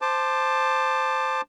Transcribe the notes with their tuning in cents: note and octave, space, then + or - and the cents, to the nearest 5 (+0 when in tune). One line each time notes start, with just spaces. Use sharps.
C5 +0 A5 +0 D6 +25